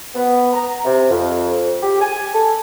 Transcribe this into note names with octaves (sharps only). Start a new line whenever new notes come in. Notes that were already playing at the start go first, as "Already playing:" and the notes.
B3
A#5
C3
F2
G4
G#5
A4